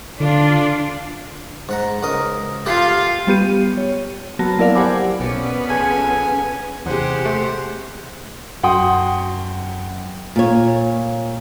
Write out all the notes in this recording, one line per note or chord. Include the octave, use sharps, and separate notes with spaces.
D3 D4 F4
G#2 F#5 A#5
C#2 A#4 D#5
F4 G4 A4 F5 F#5
G3 B3 G4 D#7
C#5
F#3 A#3 B3 F#4 A5 A#6
F#3 E4 A#4 D5 F5
G4 C5 F#5 G#5 B5 D6
B1 B3 C#4 D5
F3 A3 G#4 G#5
E2 C3 G#3 G4 C5 D#5 F#5
A3
F#2 F#4 F#5 G5 C6 D#6
A#2 C#5